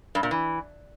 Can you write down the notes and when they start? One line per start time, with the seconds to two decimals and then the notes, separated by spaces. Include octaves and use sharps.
0.15 G2
0.23 A#2
0.31 E3